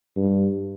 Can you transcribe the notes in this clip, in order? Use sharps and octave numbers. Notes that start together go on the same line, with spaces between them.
G2